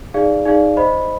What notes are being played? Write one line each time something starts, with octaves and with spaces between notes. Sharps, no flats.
D#4 G#4 D5 F5
D#4 G#4 D5 F5
C5 D#5 B5